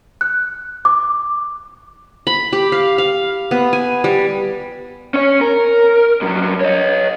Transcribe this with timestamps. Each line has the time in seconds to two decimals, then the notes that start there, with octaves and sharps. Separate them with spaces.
0.21 F#6
0.85 D6
2.27 B5
2.53 G4
2.72 F5
2.98 F5
3.51 B3
3.73 G#5
4.04 G3
5.14 C#4 C#5
5.41 A#4
6.22 G2 F#3
6.61 C#5 D#5